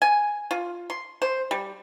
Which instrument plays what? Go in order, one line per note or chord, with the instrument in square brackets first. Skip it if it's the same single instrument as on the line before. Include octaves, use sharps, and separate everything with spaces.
[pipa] G#5
F4
C6
C5
G3